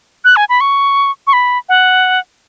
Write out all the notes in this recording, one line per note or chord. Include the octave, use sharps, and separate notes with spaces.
F#6
G#5
B5
C#6
C#6
B5
F#5